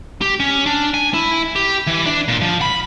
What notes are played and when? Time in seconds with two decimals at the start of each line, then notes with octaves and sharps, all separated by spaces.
0.21 G4
0.40 C#4
0.66 D4
0.94 G#5
1.14 E4
1.56 G4
1.87 E3
2.06 D4
2.28 A#2
2.41 F3
2.62 B5